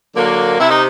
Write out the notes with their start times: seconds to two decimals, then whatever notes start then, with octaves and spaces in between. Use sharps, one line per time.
0.15 D3 F#3 A#3
0.59 C3 E4
0.70 D#4